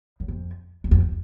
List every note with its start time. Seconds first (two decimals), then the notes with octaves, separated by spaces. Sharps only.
0.20 F#2
0.28 F2
0.84 E2
0.91 F2